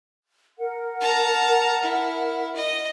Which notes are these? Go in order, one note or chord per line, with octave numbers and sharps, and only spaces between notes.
A#4 F#5
A5 A#5
E4
D#5